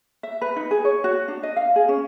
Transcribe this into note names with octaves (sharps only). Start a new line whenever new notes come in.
E5
B4
D#4
G#4
C#5
F#4
D4
D#5
F5
G#4
C#4